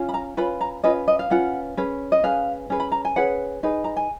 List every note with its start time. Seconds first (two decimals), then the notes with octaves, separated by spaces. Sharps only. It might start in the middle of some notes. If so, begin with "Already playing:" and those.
Already playing: C#4 F4
0.09 B5
0.14 A#5
0.37 C#4 F4 B4 B5
0.61 A#5
0.84 C#4 F4 B4 D#5
1.08 D#5
1.19 F5
1.30 C#4 F4 B4 F#5
1.77 C#4 G#4 B4
2.12 D#5
2.24 C#4 G#4 B4 F5
2.70 C#4 G#4 B4
2.80 B5
2.92 A#5
3.05 G#5
3.16 C#4 G#4 B4 F#5
3.63 D#4 G#4 B4
3.84 A#5
3.97 G#5